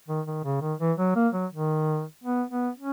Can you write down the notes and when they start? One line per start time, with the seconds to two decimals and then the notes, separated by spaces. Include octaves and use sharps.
0.08 D#3
0.26 D#3
0.44 C#3
0.61 D#3
0.80 E3
0.98 F#3
1.16 A#3
1.33 F#3
1.52 D#3
2.24 B3
2.50 B3
2.78 C#4